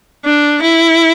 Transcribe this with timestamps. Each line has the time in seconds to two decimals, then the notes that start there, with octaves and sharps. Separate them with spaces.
0.25 D4
0.62 E4